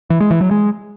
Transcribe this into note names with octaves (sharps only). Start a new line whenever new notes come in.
E3
G#3
E3
F#3
G#3